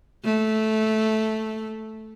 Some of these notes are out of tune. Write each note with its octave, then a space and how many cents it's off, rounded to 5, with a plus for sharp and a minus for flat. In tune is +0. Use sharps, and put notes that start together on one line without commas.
A3 -10